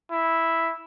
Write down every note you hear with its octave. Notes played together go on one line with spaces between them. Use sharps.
E4